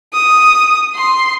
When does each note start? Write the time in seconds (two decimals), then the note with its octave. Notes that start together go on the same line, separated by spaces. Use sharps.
0.14 D#6
0.95 C6